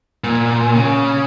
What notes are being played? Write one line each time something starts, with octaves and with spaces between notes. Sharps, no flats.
A#2
C#3